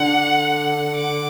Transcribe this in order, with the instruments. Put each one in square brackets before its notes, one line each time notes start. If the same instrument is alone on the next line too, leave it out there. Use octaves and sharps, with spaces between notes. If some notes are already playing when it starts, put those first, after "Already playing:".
Already playing: [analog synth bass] D3 [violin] F#5
[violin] D6